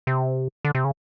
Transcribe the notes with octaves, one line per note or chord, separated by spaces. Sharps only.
C3
D3
C3
C#3